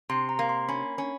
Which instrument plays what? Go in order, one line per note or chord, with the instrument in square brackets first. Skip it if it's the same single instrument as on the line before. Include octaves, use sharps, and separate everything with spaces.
[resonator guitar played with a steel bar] C3 [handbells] C6
[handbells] A#5
[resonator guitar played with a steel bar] A#3
[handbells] C6
[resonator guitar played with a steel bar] C#4 [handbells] B5
[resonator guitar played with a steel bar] C#4